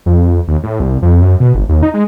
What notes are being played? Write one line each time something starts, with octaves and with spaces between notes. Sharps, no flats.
F2
D#2
A2
C2
F2
F#2
B2
G1
D#2
D#4
G#3